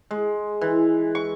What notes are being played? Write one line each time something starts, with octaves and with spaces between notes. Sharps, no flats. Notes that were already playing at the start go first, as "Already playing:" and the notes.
G#3
E3
C#6